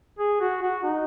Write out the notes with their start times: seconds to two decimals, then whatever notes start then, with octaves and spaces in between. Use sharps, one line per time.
0.19 G#4
0.41 F#4
0.62 F#4
0.84 D#4